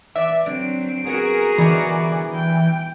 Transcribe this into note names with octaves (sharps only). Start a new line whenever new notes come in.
E3 D5 E5
D3 F#3 C4 D7
B3 F#4 G#4 A#4 C#5 F#5
B2 D3 E3 G3 D#4 D5
G5